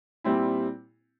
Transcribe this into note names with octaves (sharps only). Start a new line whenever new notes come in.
A#2 G3 C4 E4